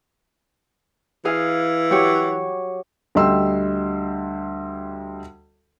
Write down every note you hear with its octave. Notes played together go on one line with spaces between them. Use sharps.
E3 G#4 F5
F#3 G4 C#5
D2 G3 D#5 G5 C6 E6